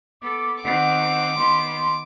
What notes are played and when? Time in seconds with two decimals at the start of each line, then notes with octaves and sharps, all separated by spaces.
0.21 B3 A4 D6
0.64 D#3 C4 F#5 D6
1.36 D#3 B3 C6